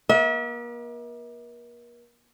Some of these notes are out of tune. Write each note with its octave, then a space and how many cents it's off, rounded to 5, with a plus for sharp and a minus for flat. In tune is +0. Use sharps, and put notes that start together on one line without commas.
A#3 +40 E5 -35